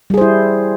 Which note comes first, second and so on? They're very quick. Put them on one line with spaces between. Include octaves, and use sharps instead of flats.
G3 G#4 C5 E4